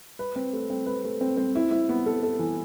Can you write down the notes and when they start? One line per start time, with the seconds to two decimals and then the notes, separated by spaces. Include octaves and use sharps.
0.19 B4
0.36 C4
0.53 A3
0.70 C4
0.86 B4
1.04 A3
1.21 C4
1.37 C4
1.55 E4
1.71 E4
1.89 B3
2.06 A4
2.23 A4
2.39 E3